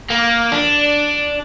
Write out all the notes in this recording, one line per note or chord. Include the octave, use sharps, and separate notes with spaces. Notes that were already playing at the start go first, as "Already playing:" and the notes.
A#3
D4